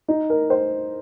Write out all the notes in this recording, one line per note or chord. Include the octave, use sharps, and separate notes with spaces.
D#4
A#4
C5